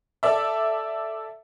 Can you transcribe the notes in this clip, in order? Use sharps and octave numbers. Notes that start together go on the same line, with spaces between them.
A4 D5 E5